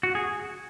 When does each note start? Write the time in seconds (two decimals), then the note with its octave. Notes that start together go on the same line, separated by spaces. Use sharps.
0.03 F#4
0.15 G#4